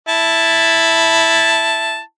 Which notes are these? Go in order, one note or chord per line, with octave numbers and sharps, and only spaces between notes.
E4 A5